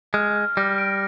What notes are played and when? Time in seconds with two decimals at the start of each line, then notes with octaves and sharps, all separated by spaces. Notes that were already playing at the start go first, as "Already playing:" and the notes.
0.14 G#3 F6
0.35 F6
0.57 G3 A#6
0.78 D7